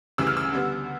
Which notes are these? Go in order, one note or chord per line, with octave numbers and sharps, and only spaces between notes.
D2 C#3 E3 G3 E6
F6
E6
D3 G3 B3